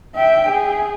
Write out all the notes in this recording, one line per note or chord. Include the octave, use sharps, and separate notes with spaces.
E5 G5
G#4